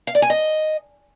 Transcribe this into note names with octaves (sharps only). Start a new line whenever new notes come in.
F5
D5
G#5
D#5